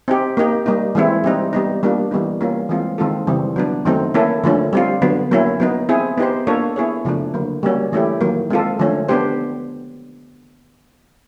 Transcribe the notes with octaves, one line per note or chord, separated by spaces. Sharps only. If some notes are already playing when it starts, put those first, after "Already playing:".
C4 D#4 G4
A#3 D#4 G4
G3 A#3 D#4
E3 G#3 C4 E4
G3 C4 D#4
G3 B3 D#4
G3 A#3 D4 F4
E3 G3 B3 D#4
G3 A#3 C#4 F4
E3 G#3 C4 F4
D#3 G#3 C4 F4 A4
C#3 E3 G3 C4
F#3 B3 D4
D#3 F#3 A3 C4 D#4
A#3 C#4 E4 A4
D3 F3 A3 C#4
G3 C4 F4
D3 F#3 B3
F#3 A#3 C#4 E4
F#3 B3 D#4
C4 E4 G#4
B3 D#4 G4 C5
A#3 D4 F4 A4 C#5
B3 E4 G#4 C#5
C#3 F3 A3 D4
D3 F#3 A#3
G3 A#3 C#4 F#4
E3 A3 C#4 E4 G4
D#3 F#3 A#3
G#3 C4 F4 A4
D3 F3 A3 C#4
B3 D4 G4 C5